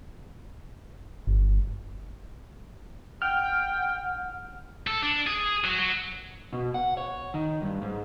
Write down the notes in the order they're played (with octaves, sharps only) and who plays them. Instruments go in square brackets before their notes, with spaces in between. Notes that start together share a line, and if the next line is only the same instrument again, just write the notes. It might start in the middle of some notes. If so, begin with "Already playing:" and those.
[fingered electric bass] G1
[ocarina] F#5 [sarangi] G5 [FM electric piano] F6
[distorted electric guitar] A4
D4
G#4
F#3
F#3
[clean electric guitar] B2
F#5
C#5
D#3
G2
G#2